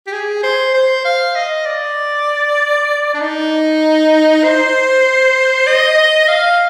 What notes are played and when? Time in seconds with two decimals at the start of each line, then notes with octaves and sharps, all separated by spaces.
0.07 G4
0.12 G#4
0.43 C5
0.74 C5
1.05 F5
1.35 D#5
1.66 D5
3.14 D4
3.21 D#4
4.43 C5
5.67 D#5
6.28 F5